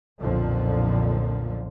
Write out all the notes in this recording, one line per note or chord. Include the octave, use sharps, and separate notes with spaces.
B1 F2 A#2 D3 F3